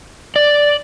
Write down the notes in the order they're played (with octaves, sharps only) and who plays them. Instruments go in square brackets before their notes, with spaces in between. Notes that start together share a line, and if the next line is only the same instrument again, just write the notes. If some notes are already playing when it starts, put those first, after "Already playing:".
[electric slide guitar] D5